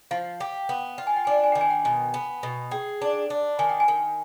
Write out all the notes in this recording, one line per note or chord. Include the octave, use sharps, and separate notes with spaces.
F3 F5
G4
B3
F4 G5
G#5
G5
D4 G#5
G5
G#5
D#3 G5
G#5
G5
B2 G#5
B3
B2
G#4 G5
D4
D4
D#3 G#5
G5
G#5
D#3